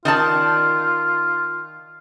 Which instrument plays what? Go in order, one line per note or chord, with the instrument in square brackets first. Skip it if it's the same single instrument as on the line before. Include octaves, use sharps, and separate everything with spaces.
[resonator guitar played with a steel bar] D#3 D5 A5 [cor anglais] F4